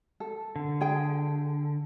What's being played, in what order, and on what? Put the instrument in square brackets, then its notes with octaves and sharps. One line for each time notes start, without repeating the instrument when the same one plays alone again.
[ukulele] A4
[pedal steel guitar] D3
[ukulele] G#4 G5